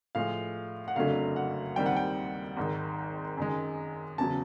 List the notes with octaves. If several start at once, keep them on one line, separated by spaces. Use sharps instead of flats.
A2 F3 G#3 F5
F#5
F#1 F2 D3 F#3 A3 F5
F#5
D#2 D#3 G3 C4 G5
F#5
G5
G#1 G#2 D#3
F#2 D#3 G#3
E2 C#3 F#3 A5